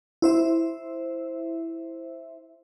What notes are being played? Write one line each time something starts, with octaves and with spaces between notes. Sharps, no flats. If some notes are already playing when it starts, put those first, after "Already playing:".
E4 C5 E5